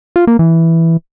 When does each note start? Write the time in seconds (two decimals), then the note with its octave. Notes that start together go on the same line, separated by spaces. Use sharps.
0.16 F4
0.27 A#3
0.39 E3